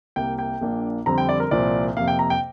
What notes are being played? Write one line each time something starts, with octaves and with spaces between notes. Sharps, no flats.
C2 C3 A#3 G5
G5
A#1 A#2 A#3 D4
F2 D3 G3 C4 A#5
G5
D5
A#4
C2 A#2 F3 C4 D5
F2 C3 A#3 F5
G5
A#5
G5